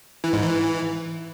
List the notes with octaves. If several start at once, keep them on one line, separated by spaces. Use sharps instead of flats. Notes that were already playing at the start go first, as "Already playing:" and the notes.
E3
G#2
E3